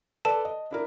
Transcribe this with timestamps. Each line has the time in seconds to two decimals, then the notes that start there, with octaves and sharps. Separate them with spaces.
0.25 A4 B4 D5 A5
0.45 D#5
0.71 D4 E4 A#4